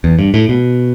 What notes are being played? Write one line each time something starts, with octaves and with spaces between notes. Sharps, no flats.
E2
G2
A2
B2